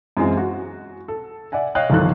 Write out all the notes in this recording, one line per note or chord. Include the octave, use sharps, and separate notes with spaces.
F#2 E3 G#3 C4 F4
F#4
A4
D5 E5 F#5 G#5
C#5 D#5 F5 G5 F#6
G1 C2 D#3 F3 A4 F#6